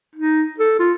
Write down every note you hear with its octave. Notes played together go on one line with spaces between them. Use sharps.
D#4
A4
F4